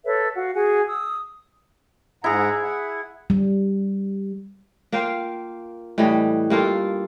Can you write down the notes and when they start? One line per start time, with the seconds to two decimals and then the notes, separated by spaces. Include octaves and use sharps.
0.05 A4 B4 C#5 E5
0.35 F#4 F5
0.54 F#4 G#4 G#5
0.87 D#6 E6
2.24 G#2 E4 G#4 F#5 A#5
2.63 F#5
3.30 G3
4.92 A#3 F4 F5 G5
5.98 A2 E3 G3 D#5
6.50 G2 A#3 F4 A4